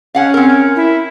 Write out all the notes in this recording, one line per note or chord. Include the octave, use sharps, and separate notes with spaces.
C#4 F5 F#5 G#5
C4 A#4
E4